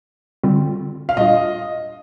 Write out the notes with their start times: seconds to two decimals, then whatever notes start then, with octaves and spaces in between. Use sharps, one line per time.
0.44 D3 G3 C4 F4
1.09 F5
1.16 A#2 G3 D4 F4 D#5